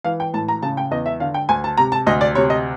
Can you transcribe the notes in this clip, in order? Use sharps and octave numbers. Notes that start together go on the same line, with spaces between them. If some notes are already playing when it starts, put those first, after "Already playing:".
E3 F5
G5
A2 A5
A#5
C#3 A5
G5
E2 D#5
E5
D3 F5
G5
D2 G#5
A5
C3 A#5
A5
D2 D#5
D5
C3 C#5
D#5